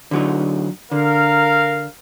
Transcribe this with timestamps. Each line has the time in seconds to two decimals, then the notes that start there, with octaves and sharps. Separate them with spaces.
0.11 D3 F#3 D#4
0.92 D3 A#4 F5